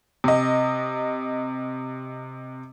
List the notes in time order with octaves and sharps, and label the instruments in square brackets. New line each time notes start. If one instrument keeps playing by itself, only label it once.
[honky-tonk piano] C3 D#5